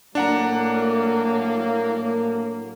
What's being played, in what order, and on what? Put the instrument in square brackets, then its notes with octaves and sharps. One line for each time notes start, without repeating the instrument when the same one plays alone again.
[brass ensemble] A2 F#3 A#3 [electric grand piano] D4 F#5 A#5